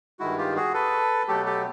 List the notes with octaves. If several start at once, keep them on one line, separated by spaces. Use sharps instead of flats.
G2 D#3 G#3 E4 F#4
F4 G4
F#4 G#4
A4 B4
B2 F#3 A3 G4 A4
G4 A4